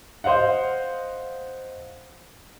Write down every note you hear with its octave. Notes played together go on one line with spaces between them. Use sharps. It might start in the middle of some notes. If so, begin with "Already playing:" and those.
C5 D#5 F5 F#5